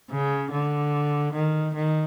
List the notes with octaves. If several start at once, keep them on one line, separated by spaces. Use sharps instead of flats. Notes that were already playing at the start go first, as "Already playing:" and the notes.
C#3
D3
D#3
D#3